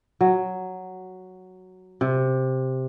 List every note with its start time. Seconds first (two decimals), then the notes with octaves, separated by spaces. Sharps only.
0.21 F#3
2.01 C3